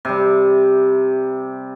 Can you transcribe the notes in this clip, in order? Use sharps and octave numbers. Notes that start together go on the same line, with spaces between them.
C3 G3